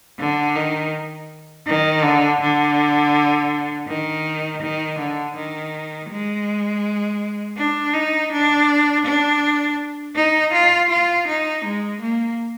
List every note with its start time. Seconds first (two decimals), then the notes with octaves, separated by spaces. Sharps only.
0.19 D3
0.56 D#3
1.66 D#3
2.03 D3
2.41 D3
3.88 D#3
4.62 D#3
4.99 D3
5.36 D#3
6.10 G#3
7.58 D4
7.94 D#4
8.32 D4
9.06 D4
10.16 D#4
10.53 F4
10.90 F4
11.27 D#4
11.65 G#3
12.02 A#3